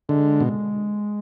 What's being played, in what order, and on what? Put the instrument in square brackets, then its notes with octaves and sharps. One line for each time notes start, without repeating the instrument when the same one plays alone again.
[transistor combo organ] D3 [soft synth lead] G#3
[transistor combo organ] B2